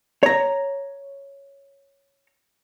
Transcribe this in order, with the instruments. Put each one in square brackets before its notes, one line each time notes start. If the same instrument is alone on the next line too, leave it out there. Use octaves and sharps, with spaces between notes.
[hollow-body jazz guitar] C#5 A#5